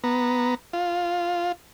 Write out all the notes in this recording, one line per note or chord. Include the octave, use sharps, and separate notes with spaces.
B3 A#5
F4